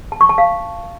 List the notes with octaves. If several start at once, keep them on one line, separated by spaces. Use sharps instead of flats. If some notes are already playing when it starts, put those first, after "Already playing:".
A5
C#6
A5
F5